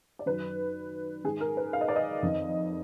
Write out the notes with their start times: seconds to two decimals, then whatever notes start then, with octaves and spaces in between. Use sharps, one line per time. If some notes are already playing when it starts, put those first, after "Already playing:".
0.19 D5
0.26 F#2 D#3 B4
1.24 G#2 D#3 G#4
1.41 A#4
1.57 B4
1.73 F5
1.81 D#5
1.88 D5
1.96 D#5
2.23 F2 D#3